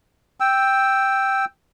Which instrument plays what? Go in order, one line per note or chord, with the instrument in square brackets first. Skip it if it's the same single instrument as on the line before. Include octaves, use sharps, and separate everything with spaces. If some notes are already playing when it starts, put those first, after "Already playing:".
[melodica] G5 E6